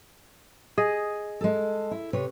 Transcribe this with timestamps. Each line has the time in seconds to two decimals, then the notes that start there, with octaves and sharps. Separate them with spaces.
0.78 G#4 D#5
1.41 G#3 A4
1.91 E4
2.13 C3 B4 C#5